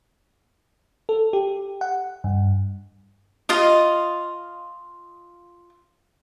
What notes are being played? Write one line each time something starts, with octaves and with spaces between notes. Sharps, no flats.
A4
G4
F#5
G2
F4 D#5 F5